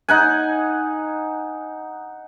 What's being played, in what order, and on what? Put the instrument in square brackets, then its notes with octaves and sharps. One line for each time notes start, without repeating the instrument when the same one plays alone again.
[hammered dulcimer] D#4 F#5 G#5